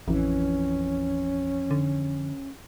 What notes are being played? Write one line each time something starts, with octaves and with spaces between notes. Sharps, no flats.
A1 F2 E3 C#4
D3